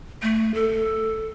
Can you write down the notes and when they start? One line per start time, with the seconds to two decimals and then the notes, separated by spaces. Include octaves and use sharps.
0.22 A3
0.54 A4